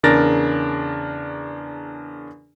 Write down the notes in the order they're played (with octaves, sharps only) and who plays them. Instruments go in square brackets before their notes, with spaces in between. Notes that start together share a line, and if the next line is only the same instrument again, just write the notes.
[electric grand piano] E2 C#3 D4 A#4 A6 A#6